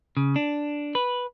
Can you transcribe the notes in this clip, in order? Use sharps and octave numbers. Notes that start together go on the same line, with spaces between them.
C#3
D4
B4